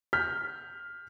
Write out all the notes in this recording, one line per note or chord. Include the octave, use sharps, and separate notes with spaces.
F6 G6 B6